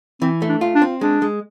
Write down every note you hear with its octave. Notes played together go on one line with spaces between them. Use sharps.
E3 C4
A3
D4
F4
D4
C4
G#3 D4
G#3